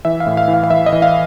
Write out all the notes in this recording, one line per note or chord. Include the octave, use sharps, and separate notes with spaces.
E3 E5
F5
A2
F5
E3
F5
F5
E3 E5
D#5
E3
F5